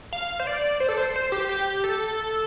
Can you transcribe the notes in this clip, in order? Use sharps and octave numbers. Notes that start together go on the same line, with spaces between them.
F5
C5
D5
C5
A4
C5
C5
G4
G4
A4